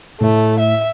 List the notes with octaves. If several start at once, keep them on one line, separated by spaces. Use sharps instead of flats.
A2 A3
E5